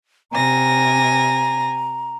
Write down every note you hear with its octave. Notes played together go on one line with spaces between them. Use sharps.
C3 G#5 A#5 A#6